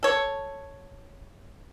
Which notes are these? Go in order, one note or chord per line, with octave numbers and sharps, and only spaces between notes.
A4 C#5